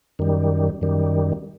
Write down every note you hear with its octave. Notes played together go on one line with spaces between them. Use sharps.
F#2 D#3 G3
F#2 D#3 G3